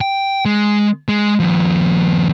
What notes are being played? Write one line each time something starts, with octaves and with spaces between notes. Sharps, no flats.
G5
G#3
G#3
D#2 F3